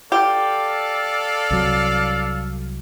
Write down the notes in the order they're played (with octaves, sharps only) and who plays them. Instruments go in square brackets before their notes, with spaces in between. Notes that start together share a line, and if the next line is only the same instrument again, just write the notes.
[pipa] G4 [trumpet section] A4 D5 F5
[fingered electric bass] C2 F#3